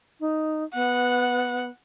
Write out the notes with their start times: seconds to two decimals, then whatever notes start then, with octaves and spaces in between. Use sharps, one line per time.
0.20 D#4
0.74 B3 F#5